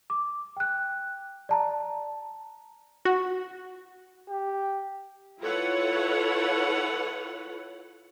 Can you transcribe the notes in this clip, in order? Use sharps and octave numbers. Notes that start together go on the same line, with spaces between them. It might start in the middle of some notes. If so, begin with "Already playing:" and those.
D6
G5 F#6
D5 A5 A#5
F#4
G4
E4 F4 A4 B4 C#5 F#5